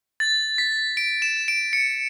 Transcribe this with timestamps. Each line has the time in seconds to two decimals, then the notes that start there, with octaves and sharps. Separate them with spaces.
0.20 A6
0.58 B6
0.97 D7
1.22 E7
1.48 D7
1.73 C#7